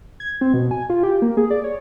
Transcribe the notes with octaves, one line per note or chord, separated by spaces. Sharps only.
G#6
C4
B2
G#5
F4
G4
A#3
G#4
D5
C#5